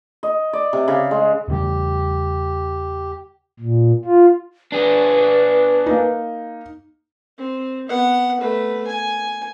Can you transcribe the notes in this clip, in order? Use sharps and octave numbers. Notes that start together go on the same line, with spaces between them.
D#5
D5
C3
C#3
G#3
E2 C#3 G3 G4
A#2
F4
D4 G#4 B4
A#3 D#4
C4
B3 F#5
A3 B4
G#5